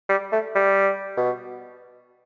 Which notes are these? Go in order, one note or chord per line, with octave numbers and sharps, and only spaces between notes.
G3
A3
G3
B2